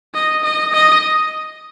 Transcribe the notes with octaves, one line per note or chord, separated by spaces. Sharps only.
D#5
D#5
D#5